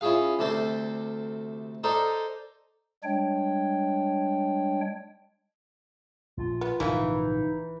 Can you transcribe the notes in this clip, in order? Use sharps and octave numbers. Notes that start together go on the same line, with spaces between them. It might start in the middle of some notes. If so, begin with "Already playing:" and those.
C#4 E4 F4 G#4 F5
D2 C3 A4 C5 D5
D#4 A4 A#4 C5 D5 D#5
G3 G#3 D4 C#5 G5
A#1 B2 F4
B3
A#1 G#2 C#3 E3 F3 A#3 B3 D#4